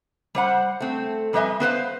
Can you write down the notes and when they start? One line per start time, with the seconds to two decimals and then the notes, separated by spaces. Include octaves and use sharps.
0.35 G3 C5 F#5
0.80 A3 C4
1.33 F2 G3 B4 D#5 E5 G#5
1.60 B3 B4 C5 F5